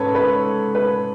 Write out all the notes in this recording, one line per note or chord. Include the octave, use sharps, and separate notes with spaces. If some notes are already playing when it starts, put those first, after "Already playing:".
Already playing: G#2 C#4 A4 B4 C#5
B4
B4